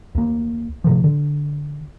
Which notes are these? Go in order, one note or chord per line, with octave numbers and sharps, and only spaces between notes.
D2 A#3
A2 C3 F3
D3